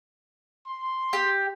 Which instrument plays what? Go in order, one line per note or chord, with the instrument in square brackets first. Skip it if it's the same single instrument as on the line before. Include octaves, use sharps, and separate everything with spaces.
[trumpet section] C6
[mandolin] G4